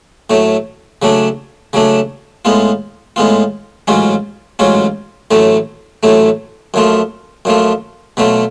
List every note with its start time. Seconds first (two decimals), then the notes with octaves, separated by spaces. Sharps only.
0.30 A2 F#3 A3
1.02 C#3 F#3 A3 D4
1.73 C#3 F#3 A3 D4
2.45 A2 G#3 B3 F4
3.16 A2 G#3 B3 F4
3.88 A1 G#2 F#3 C#4 F4
4.59 A1 G#2 F#3 C#4 F4
5.31 A1 A2 F#3 A3
6.03 A1 A2 F#3 A3
6.74 F#2 F3 A3 F4
7.45 F#2 F3 A3 F4
8.17 B2 F#3 A3 F4